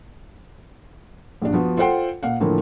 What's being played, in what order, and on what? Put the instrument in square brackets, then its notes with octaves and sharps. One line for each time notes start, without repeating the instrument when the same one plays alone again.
[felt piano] A#1 G2 D4
F3 B3 F#4
F4 A4 C5 F#5 G5 C6
A#2 F5 F#5
A2 D3 E3 F3 A#3